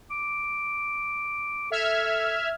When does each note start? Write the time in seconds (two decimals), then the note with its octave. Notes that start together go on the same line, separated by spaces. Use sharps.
0.11 D6
1.71 A4 E5 F6 G#6